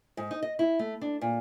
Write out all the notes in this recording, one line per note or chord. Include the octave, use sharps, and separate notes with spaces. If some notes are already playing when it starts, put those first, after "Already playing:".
G#2
D#4
D#5
E4
A3
D4
A#2